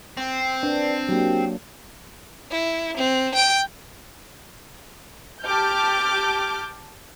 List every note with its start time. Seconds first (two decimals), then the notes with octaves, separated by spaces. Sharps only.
0.17 C4
0.63 D4 B4 D5
1.09 F#3 A#3 D4 G4 G5
2.51 E4
2.97 C4
3.35 G5 D7
5.44 G4 A5 D6 F6 G6